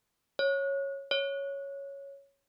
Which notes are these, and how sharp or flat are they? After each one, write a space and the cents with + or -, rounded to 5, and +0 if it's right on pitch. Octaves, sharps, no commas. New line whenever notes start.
C#5 -10
C#5 +0